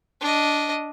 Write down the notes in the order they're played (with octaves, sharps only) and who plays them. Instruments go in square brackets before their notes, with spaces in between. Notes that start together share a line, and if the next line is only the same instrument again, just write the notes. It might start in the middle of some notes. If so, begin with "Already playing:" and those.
[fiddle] D4 D#5